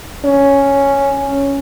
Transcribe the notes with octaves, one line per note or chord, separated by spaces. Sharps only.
C#4